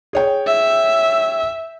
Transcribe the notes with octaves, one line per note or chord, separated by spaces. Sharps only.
G#4 C#5 G5
E5